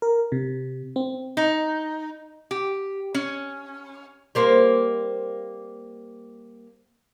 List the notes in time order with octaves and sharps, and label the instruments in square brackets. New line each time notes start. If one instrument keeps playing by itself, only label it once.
[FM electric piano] A#4
C3
C4
[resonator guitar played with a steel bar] D#4
G4
C#4
[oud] G3 A#3 C4